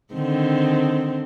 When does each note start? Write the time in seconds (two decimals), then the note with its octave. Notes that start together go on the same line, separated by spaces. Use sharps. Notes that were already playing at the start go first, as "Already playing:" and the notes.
0.14 D3 D#3 C4